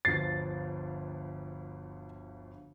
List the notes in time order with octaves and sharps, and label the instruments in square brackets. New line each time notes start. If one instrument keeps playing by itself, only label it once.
[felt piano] G1 D2 F3 [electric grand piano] A6 C7